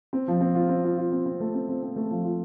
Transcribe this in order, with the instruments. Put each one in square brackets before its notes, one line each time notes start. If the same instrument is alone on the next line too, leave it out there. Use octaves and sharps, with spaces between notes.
[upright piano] C4
F3
C4
F4
C4
F4
F4
C4
C4
A3
C4
C4
C4
A3
F3
F4